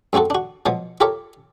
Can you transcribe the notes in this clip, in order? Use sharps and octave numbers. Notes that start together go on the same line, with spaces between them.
F#2 A3 C4 F#4 A4
D4 F#4
B2 F3 F#3
F4 G4 A4 A#4 C#5 E5